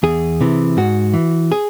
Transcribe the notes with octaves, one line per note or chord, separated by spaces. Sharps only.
E2 G#4
C3 E3
G#2 F#4
E3
G#4